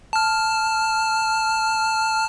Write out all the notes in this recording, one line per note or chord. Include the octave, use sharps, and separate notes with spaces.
A5 F6